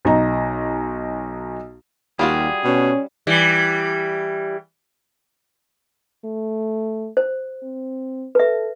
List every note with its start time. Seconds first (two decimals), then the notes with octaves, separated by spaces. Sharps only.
0.05 B1 D#4 A#5
2.19 D#2 G3 F4 F#4 G#4
2.64 B2 C#4
3.27 E3 G3
6.25 A3
7.17 C5
7.63 C4
8.35 A4 B4 E5